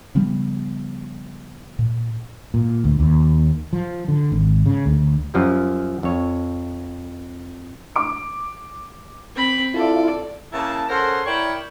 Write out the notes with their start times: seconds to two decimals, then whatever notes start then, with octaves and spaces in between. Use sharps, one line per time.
0.15 C#3 F3 G3 B3
1.79 A#2
2.54 A#2
2.84 D2
3.00 D#2
3.73 F3
4.08 D3
4.32 G#1
4.66 C#3
4.86 D2
5.34 F#2 F3 G3
6.03 F2 C#5
7.96 D6 D7
9.35 C4 B5
9.74 E4 F4 A4 D5
10.52 C#3 A#3 E4 A5
10.89 C#3 A4 A#4 C5 F#5 C6
11.26 E4 A#4 C#5 D5 G5